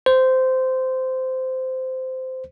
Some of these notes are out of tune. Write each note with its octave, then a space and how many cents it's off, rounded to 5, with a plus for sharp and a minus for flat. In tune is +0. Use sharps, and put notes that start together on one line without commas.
C5 -15